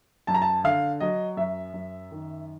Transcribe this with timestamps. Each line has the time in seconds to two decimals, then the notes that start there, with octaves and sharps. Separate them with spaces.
0.27 F#2 A5
0.34 A#5
0.42 A5
0.64 D3 F5
1.00 F#3 D#5
1.37 F#2 E5
1.74 F#2
2.11 D#3